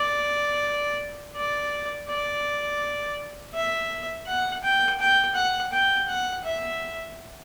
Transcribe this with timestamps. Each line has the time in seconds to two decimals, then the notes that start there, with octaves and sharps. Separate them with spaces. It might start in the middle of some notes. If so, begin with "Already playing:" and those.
Already playing: D5
1.36 D5
2.08 D5
3.54 E5
4.27 F#5
4.63 G5
4.99 G5
5.35 F#5
5.72 G5
6.08 F#5
6.44 E5